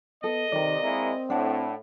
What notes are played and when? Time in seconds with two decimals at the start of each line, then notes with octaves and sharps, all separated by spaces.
0.24 B3 A4 D#5
0.52 C3 D#3 A#4 D5
0.83 G#3 A#3 C4 E4
1.30 A2 D4 F#5 A5